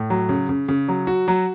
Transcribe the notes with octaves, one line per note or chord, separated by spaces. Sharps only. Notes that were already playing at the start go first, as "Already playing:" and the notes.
Already playing: A2
F#3
C#3
C#3
C#3
F#3
F#4
F#3